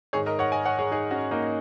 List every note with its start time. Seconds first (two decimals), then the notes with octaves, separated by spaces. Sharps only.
0.13 G#2 D#3 G#4 C#5
0.26 A#4 D#5
0.39 C#5 F#5
0.52 D#5 G#5
0.65 C#5 F#5
0.79 G#4 C#5
0.91 D#4 G#4
1.11 C#4 F#4
1.31 A#3 D#4